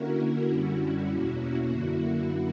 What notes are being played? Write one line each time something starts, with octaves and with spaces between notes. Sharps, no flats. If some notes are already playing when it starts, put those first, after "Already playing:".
Already playing: D3 A#3 C#4 E4 F#4 A#4
F#4
F#2 D3 G3 C#4 E4
F#4
E2 B2 A#3 C#4 E4
F#4
F#2 D3 A#3 E4